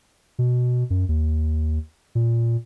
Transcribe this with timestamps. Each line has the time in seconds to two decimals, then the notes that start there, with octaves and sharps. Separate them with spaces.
0.39 B2
0.90 F#2
1.09 D#2
2.15 A#2